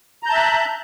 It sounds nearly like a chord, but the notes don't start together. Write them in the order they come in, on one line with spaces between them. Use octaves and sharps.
A#5 G6 A5 E5 F#6